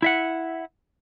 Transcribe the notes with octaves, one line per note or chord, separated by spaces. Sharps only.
E4 E5 F#5